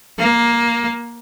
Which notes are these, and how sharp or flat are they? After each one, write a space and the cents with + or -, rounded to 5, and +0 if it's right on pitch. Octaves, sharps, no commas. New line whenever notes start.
A#3 +10